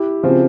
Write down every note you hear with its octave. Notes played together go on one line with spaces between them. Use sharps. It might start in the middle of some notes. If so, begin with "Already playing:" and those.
Already playing: E4 G4
C#3 F3 C4